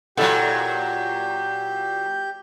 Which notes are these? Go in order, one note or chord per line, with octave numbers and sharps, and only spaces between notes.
A#2 F#3 E4 G4 A4 F#5 G6